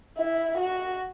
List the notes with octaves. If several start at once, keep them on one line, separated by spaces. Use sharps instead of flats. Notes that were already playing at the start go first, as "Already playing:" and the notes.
E4
F#4